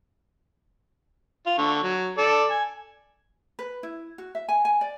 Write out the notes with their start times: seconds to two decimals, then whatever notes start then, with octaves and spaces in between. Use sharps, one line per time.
1.46 F4
1.58 D3 C#6
1.83 F#3
2.18 A4 D5
2.50 G#5
3.59 B4
3.83 E4
4.18 F#4
4.35 E5
4.49 G#5
4.65 G#5
4.81 D5